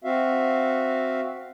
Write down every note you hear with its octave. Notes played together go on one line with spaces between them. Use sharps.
C4 F#4 E5 F5